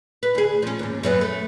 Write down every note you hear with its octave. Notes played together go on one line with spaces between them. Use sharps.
B4
D2 G#4
F3 C#4
D#2 G#2
F#2 F#3 B3
A3